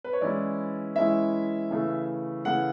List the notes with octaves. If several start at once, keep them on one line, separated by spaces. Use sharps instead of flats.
B4
C#5
E3 G#3 C#4 E4 D5
E3 G#3 C#4 E4 E5
C#3 E3 A3
C#3 E3 A3 F#5